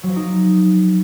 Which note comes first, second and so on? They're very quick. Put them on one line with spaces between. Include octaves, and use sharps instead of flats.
F#3 F3 A#4 D#4